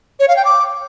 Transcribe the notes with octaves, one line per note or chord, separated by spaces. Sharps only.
C#5
F5
G5
D6